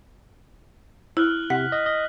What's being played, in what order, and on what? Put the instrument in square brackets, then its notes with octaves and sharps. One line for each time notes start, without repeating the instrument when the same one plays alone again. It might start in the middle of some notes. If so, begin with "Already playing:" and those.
[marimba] E4 [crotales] F6 F#6 F#7
[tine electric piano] C3 [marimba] F#5 [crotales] B6
[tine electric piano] D#5
D#5